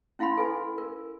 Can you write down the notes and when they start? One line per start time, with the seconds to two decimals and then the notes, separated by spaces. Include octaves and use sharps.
0.19 C#4 E4 F5 F#5 B5 C6
0.37 A4 B4 G#5
0.78 A#4